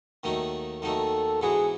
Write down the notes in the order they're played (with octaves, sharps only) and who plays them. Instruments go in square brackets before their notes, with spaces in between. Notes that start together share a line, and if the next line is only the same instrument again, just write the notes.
[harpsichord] D#2 D#3 F#3 A3 D#4
[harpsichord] D#2 D#3 F#3 A3 D#4 [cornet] A4
[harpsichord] G#2 E3 B3 F#4 [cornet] G#4